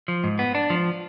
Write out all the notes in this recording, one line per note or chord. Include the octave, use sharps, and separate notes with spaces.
F3
G#2
B3
D4
F3